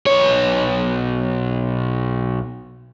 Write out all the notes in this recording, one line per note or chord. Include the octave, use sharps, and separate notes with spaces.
B1 C#5